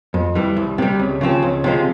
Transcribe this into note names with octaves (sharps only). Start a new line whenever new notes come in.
F2
E3 G3
C2
C3 G3
C#2
C#3 F3 C4
C#2
C3 F3 G#3